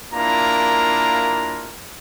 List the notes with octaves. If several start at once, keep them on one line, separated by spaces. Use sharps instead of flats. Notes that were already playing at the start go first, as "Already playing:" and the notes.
A#3 D4 E4 F4 A#4 A#5